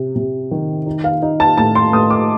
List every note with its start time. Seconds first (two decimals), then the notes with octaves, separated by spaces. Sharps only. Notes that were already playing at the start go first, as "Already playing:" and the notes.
Already playing: C3
0.16 C3
0.51 D#3
0.86 D#4
1.04 F5
1.22 D#4
1.40 A5
1.58 A2 A5
1.75 C6
1.93 A2 D#6
2.10 D6